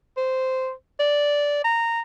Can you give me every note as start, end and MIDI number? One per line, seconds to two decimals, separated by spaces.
0.17 0.71 72
1.00 1.59 74
1.64 2.01 82